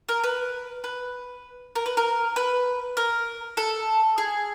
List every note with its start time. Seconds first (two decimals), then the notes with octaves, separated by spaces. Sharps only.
0.09 A#4
0.24 B4
0.84 B4
1.75 A#4
1.86 B4
1.97 A#4
2.36 B4
2.97 A#4
3.57 A4
4.18 G#4